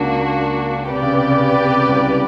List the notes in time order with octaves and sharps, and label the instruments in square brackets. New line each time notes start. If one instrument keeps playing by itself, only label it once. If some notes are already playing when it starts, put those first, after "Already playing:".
Already playing: [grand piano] C#2 C#3 [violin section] A#3 D4 F#4
[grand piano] C3 [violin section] G4 B4 D5
[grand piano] C#3
C3
C#3
C3
C#3
C3
C#3
C2 C3